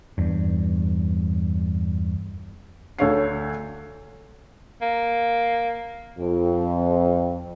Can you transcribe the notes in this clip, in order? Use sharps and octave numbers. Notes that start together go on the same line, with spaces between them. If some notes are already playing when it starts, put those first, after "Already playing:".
E2 G2
D2 A4 C#5 F5 C7
A#3
F2